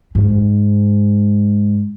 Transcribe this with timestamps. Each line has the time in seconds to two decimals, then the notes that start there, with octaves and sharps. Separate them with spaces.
0.15 G#2